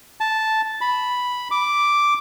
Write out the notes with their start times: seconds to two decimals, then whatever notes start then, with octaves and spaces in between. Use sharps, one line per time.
0.20 A5
0.81 B5
1.51 D6